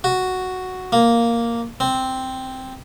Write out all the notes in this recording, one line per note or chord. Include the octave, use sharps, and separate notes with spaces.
F#4
A#3
C4